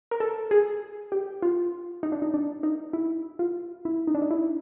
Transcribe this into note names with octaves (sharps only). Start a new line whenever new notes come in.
A#4
A4
G#4
G4
F4
D#4
D4
D#4
D4
D#4
E4
F4
E4
D#4
D4
D#4
E4